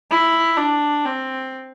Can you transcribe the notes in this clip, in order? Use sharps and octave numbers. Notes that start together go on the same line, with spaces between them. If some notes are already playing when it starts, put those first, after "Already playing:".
E4
D4
C4